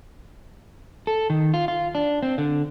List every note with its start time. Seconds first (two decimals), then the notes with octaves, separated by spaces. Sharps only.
1.07 A4
1.30 D#3
1.54 F4
1.68 F4
1.95 D4
2.23 C4
2.38 D3